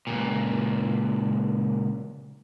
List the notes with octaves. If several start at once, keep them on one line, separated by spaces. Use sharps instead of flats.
C#2 A#2